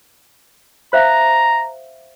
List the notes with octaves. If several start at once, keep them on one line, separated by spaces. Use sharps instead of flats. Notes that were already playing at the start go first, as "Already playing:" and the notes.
C5 E5 F5 A#5